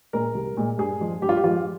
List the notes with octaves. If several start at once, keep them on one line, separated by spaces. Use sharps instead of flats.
A#2 G#3 A#4
C2
A#2 G#3
G2 G#4
F3 G#3
G2 G4
F4
G4
F3 G#3 F4